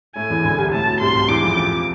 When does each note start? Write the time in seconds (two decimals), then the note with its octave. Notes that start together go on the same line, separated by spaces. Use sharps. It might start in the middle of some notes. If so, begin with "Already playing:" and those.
0.16 A2 A3 G#5
0.30 E2 E3
0.44 D2 D3
0.58 C2 C3
0.72 A2 A5
0.86 B2
1.00 C2 C3 C6
1.14 C2 C3
1.28 E2 E3 D6
1.42 F2 F3
1.57 F2 F3